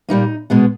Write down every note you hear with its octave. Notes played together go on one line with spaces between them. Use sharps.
A#2 G3 A#3 D#4
B2 G#3 B3